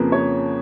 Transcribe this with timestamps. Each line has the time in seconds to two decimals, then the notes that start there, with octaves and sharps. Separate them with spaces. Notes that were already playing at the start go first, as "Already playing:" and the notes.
Already playing: F2 C#3 F3 A#3 B4
0.12 C#5